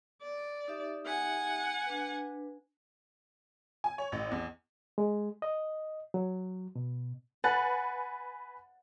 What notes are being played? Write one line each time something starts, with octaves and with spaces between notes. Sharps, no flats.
D5
D#4 G4 E5
F#5 G#5
D4 B4
G#5
C#5
A1
E2
G#3
D#5
F#3
B2
B4 F#5 G#5 A6